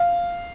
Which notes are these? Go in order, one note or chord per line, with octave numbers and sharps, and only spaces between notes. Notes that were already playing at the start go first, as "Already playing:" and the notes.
Already playing: F5